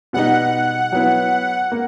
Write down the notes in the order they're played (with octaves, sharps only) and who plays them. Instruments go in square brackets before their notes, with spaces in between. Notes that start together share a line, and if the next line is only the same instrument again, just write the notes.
[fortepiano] B2 G3 B3 D#4 [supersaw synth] F#5
[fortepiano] F#3 B3 E4
A#3